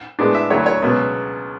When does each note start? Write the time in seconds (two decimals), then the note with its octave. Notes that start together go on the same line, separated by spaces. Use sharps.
0.19 A2 G#3 B3 D4
0.35 E5
0.50 D2 D3 F#3 A3 C#5
0.66 C#5
0.82 C#2 B2 F#3 B3